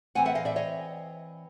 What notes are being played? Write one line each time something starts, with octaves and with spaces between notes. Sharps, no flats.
E3 A3 C4 F#5 G#5
E5 F#5
D#5 F5
D5 E5
C#5 D#5